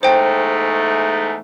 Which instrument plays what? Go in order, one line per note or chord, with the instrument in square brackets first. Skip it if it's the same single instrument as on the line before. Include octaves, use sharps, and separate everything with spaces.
[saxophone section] E2 G#2 A3 [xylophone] C5 G5